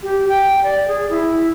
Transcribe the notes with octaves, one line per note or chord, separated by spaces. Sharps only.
G4
G5
D5
G#4
E4